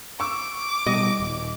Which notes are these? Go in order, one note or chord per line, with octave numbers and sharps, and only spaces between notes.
C#6 D6 E6
B2 G3 D#5
D#1